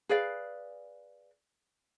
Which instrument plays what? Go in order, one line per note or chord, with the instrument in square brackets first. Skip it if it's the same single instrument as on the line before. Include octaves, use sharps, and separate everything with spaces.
[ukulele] G#4 B4 D5 F5